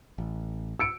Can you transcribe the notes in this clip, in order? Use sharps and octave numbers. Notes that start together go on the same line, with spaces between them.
A1
E6 C#7 D7